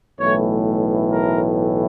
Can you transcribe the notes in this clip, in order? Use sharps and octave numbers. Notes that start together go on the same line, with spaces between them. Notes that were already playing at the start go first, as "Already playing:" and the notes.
B1 A2 E3 A3 C#5
A#4